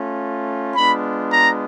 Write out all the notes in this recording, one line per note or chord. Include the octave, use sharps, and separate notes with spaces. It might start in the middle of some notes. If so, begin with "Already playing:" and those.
Already playing: A3 C#4 F4
G#3 B3 D4 F4 B5
A#5